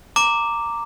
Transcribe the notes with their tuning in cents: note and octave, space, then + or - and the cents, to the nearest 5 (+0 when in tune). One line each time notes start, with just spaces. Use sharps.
A#5 -15 D6 +0